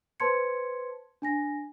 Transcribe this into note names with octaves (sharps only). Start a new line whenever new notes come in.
B4 C5 A5 C6 G#6 C#7
D4 G#5 A#6